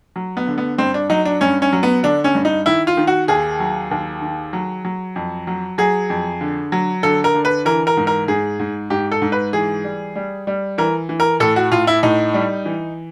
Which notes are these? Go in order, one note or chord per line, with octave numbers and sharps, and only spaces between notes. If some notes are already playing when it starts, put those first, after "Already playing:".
F#3
B3
D3
B3
G2 C4
D4
F#3 D#4
D4
G2 C#4
C#4
F#3
B3
D3 D4
C#4
G2
D#4
D#3 E4
F4
D#3
F#4
D#2 G#4
F#3
D#2
D#3
F#3
F#3
F2
F#3
F#3 G#4
F2
D3
F#3
D3 A4
A#4
D3
B4
E3 A#4
A#4
G#2
A#4
G#2 G#4
G#2
G#2 G4
A4
G#2
B4
E3 G#4
G3
G3
G3
E3 A#4
E3
A#4
A2 A4
F#4
A2 F4
E4
A2 D#4
G3
E3